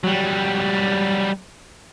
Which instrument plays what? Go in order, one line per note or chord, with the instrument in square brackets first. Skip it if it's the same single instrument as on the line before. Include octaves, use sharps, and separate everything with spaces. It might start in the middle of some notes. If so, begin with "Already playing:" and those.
[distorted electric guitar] F#3 G3